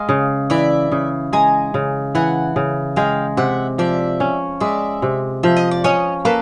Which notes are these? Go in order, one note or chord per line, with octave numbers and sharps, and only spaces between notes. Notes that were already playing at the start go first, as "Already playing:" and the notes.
Already playing: G#3 D#5 F5
C#3
E3 D5 E5
C#3
G#3 G#5 A#5
C#3
E3 F#5 G#5
C#3
G#3 F5 G5
C3 E5 F#5
F3 D5 E5
C#4
G#3 D5 E5
C3
F3 E5
D#5
D5
C#4 C#5 D#5
A#3 A4 B4